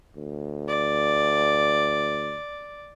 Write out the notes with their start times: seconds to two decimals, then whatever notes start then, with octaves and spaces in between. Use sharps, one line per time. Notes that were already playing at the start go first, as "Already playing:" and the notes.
0.16 D2
0.68 D5